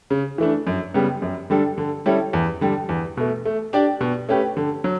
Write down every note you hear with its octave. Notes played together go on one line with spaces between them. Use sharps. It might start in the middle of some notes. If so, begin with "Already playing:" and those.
C#3
E3 A3 D4
F#2
C#3 G3 B3
F#2
D3 G3 D4 A4
D3
G3 C#4 E4 A4
E2
D3 G3
E2
B2 A3
A3
D4 G4 D5
B2
A3 C#4 G4 B4
D3
F#3